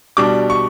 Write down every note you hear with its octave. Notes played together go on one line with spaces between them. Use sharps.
B2 G3 D4 D6
C#6